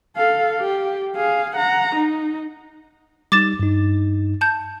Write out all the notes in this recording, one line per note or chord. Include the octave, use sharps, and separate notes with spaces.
A4 F5
G4
G#4 F5
F#5 A#5
D#4
G3 D#4 D6 A6 E7
G2 D#4
A5 G6